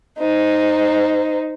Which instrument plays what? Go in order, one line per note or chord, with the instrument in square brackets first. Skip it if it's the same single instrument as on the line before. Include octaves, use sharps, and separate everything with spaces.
[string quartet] D#4 C5